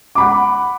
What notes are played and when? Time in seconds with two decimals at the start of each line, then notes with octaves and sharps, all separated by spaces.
0.15 D6
0.18 B5
0.20 F#5